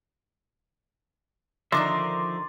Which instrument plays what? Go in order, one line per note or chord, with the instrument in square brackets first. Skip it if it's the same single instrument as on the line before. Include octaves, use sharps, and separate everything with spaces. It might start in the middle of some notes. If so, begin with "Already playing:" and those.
[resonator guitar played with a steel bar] D3 D#3 D#4 [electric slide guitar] F3 A#4 E5 [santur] D5 [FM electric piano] C6